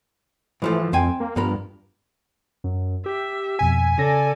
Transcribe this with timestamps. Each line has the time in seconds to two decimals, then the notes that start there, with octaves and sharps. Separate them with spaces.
0.62 G#2 E3 F3 A3
0.93 F2 C4 G5 G#5
1.20 A#3
1.36 G2 F3 B3 A#4
2.64 F#2
3.06 G4 E5
3.59 F2 B2 G#5 B6
3.98 C#3 C#4 A4 D5 A#6